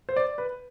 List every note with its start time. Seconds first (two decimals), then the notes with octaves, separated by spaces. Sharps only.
0.09 C5
0.16 D5
0.38 B4